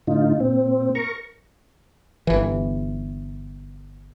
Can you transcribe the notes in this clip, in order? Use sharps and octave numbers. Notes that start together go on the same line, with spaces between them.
A2 D3 D#4 F4
A#2 C4
A#4 A#5 C#6
G1 E3